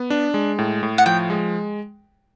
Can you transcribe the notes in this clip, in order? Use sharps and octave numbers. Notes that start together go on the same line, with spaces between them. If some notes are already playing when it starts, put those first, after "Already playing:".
Already playing: B3
D4
G#3
A2
A2
F#5
F3 G5
G#3